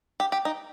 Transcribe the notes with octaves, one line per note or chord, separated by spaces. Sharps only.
G4
G4
D#4